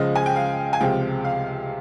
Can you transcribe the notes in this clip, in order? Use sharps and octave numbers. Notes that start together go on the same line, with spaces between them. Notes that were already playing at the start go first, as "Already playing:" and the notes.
Already playing: C#2 C#3 F3 G#3 D#5
G#5
G5
F5
G#5
C#2 C3 F3 G#3 G5
F5